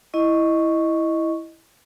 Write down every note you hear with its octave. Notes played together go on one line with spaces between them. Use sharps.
E4 D#5 C#6